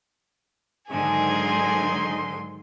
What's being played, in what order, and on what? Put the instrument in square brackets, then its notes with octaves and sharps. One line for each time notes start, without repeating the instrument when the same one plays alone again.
[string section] G#2 D3 D#3 [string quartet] F#3 G#5 [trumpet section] D#4 C6 [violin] G#4